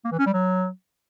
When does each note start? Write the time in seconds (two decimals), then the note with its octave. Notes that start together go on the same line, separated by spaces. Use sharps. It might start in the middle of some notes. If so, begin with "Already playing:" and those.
0.05 A#3
0.12 E3
0.19 C#4
0.26 G3
0.34 F#3